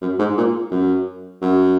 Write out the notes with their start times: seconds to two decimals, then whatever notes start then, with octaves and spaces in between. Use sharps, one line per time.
0.01 F#2
0.19 G#2
0.37 A#2
0.71 F#2
1.42 F#2